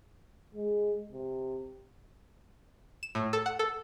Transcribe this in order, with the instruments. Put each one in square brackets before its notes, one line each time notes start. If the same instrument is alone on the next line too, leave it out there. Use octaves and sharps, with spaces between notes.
[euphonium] G#3
C3
[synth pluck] E7
A2
A4
F#5
A4